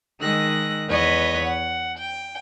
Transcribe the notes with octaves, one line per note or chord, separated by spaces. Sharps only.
D#3 G#3 E6 F#6 A#6
E2 B4 C#5 D#5 F#6
F#5
G5